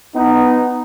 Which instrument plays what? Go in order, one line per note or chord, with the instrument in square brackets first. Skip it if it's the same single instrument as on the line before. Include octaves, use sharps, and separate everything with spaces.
[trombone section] B3 D#4